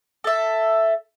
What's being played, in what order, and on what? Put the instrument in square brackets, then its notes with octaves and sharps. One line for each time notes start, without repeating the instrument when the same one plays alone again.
[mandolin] A4 E5